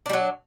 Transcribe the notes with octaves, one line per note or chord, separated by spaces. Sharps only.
F#3 G3 D4